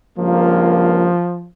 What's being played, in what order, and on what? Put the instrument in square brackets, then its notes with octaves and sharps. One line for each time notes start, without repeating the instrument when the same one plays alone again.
[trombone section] C#2 G2 A#3 [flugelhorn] F3